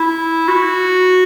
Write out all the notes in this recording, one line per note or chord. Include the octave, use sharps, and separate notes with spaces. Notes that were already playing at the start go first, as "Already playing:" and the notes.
Already playing: E4
F#4